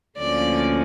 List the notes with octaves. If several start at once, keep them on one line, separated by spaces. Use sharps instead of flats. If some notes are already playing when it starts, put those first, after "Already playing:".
D2 D3 F3 A#3 C#4 D5